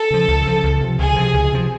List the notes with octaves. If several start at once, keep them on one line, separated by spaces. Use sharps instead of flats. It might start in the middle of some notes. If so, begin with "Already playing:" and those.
Already playing: A4
C#3 F3
C#2
C#3 F3
C#2
C3 F3
C#2 G#4
C3 F3
C#2
C3 F3